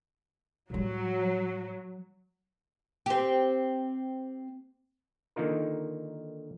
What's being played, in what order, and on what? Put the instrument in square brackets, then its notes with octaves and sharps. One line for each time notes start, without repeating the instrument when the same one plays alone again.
[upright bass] A2 G3 [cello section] F#3
[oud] C4 G4
[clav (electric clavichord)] D3 D#3 A#3 D#4 F4 A#4